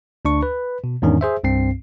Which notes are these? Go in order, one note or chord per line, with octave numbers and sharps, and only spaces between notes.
D2 D4 C#6
B4
B2
E2 G#2 D#3 C#4 D4
G#4 C5 E5
C2 G2 C4 C7